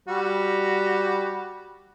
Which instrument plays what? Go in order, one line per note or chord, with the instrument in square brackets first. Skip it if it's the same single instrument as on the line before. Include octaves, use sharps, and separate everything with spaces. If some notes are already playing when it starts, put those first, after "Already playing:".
[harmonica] G3 F#4